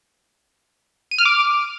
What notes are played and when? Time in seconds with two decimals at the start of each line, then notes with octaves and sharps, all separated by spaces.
1.11 D#7
1.18 F6
1.25 D6